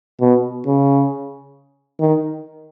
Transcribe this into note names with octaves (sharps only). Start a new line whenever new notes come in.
B2
C#3
D#3